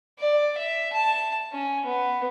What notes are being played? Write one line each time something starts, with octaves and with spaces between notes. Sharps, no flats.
D5
E5
A5
C#4
B3